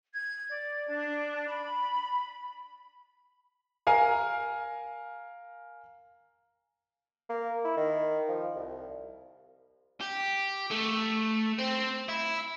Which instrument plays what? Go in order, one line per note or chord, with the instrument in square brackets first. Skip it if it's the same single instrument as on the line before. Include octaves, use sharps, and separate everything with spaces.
[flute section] G#6
D5
D4
B5
[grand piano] A#4 F5 G#5
[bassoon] A#3
E4
D#3
F3
C2
[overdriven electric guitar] G4
A3
C4
E4